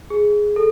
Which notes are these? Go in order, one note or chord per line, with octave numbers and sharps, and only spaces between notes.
G#4
A4